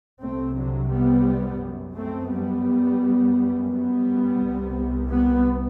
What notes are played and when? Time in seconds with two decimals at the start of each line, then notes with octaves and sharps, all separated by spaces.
0.21 C2 C3 A3 C4
0.56 D3 F#3
0.91 G3 B3
1.62 F#2
1.96 A3 C4
2.31 G3 B3
3.01 F#2
3.70 G3 B3
4.40 C2 C3
5.09 G3 B3